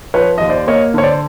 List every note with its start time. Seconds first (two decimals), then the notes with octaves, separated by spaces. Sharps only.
0.14 F3 B4 C#5
0.38 D#2 D#5
0.50 C5 D5
0.67 A#3 C#5 D#5
0.94 D3 C#5
1.03 C5 D5